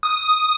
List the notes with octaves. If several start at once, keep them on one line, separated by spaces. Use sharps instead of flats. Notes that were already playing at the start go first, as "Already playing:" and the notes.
D#6